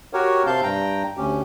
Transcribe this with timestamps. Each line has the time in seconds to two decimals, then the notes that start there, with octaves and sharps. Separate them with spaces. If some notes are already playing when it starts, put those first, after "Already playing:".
0.13 F#4 G4 A#4 C#5
0.47 C3 C4 F5 A5 G6
0.63 G2 G5 A#5
1.17 D2 C#4 G4